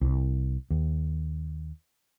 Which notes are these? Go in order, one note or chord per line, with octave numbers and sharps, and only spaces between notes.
C2
D#2